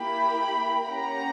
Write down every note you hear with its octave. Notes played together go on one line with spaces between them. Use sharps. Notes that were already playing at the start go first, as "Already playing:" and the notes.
Already playing: A#3 E4 G4 G5 B5
A#3 C#4 G4 F#5 A#5